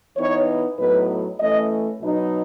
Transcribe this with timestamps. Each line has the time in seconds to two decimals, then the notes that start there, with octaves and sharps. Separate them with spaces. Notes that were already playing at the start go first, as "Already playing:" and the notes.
0.17 E3 B3 D#4 C#5
0.78 A2 F#3 B3 D#4 B4
1.40 E3 A3 C#4 D#5
2.02 B2 F#3 B3 D#4